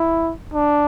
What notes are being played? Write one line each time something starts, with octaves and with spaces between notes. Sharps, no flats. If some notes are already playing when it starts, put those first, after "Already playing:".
Already playing: E4
D4